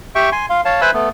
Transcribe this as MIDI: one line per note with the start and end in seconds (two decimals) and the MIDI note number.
0.15 0.30 67
0.15 0.30 76
0.15 0.30 79
0.15 0.30 85
0.32 0.46 80
0.32 0.46 84
0.50 0.61 77
0.50 0.61 84
0.65 0.81 73
0.65 0.81 77
0.65 0.81 81
0.81 0.91 71
0.81 0.91 72
0.81 0.91 76
0.81 0.91 80
0.81 0.91 83
0.81 0.91 88
0.94 1.09 57
0.94 1.09 59